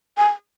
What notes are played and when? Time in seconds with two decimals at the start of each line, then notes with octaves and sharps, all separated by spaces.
0.17 G#5